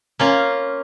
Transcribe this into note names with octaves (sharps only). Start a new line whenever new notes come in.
A#3 C#4 F4